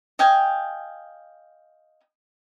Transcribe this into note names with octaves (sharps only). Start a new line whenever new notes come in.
D#5 F5 G5 G#5